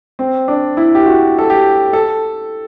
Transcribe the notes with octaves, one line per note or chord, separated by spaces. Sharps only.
C4
D4
E4
G4
F#4
A4
G4
A4